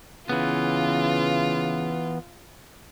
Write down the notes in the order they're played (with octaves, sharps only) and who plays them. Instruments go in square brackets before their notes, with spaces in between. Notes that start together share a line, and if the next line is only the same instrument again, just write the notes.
[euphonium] C#3 [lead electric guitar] E3 B3 [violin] F4